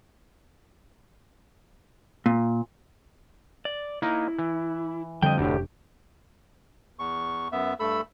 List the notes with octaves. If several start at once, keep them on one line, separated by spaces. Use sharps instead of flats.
A#2
D5
A#3 D#4 E4
E3
F2 D3 G3 D#5 G5
F1 D2 A2 D4 G4
E2 C#6
F#2 B3 E5
G2 A3 A4 B5 E6